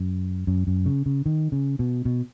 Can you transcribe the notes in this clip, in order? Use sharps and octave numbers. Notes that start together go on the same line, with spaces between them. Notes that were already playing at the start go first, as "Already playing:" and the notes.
Already playing: F#2
F#2
F#2
C#3
C#3
D#3
C#3
B2
B2